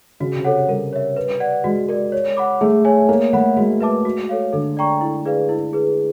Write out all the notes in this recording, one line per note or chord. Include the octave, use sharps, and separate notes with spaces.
C#3 F#4
C3
A4 C#5 F#5
G3 A#4
C#5 E5
B4
D5 F#5
G#3 F#4
A#4 D5
C#5
F#5 B5 D6
A3 G#4
C#5 E5 G#5
A#3 C#5
A3 F#5 B5
G#3 F#4
B4 E5 A5 D6
F#4
A4 C#5 F5
D3 A4
D5 G5 A#5 C#6
E4
G#4 B4 D5 F5
E4
G#4 B4